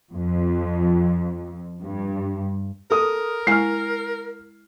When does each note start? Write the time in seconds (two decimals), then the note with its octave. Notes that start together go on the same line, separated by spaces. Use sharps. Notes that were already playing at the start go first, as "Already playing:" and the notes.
0.14 F2
1.82 G2
2.91 A4 A#4 D#6
3.47 G#3 E4 G#5 F6 C7